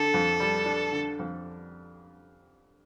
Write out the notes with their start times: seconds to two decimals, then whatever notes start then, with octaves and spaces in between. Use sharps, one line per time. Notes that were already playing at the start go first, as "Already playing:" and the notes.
Already playing: D3 A4
0.14 F2
0.40 G3
0.66 D4
0.92 D3
1.19 F2